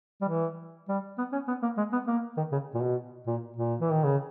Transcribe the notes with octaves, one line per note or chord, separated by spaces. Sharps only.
G3
E3
G3
B3
C#4
B3
A#3
G#3
B3
A#3
D#3
C#3
A#2
B2
A#2
A#2
E3
D#3
C#3